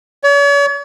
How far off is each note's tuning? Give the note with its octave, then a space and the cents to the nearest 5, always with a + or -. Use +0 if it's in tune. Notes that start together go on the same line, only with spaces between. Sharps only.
C#5 +45